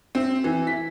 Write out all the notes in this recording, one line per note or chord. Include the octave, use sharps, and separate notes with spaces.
C4
E3
B6